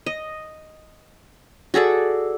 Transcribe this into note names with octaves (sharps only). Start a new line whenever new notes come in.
D#5
F#4 G#4 A4 D5